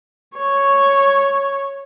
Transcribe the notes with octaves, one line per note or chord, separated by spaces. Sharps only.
C#5